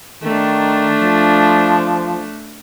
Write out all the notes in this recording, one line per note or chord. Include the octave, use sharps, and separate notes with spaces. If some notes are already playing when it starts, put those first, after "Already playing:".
D#3 A3 D4
F3